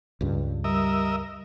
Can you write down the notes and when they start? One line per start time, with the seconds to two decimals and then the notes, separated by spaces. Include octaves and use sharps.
0.21 C#2 G2
0.64 G3 A#4 D#5 E5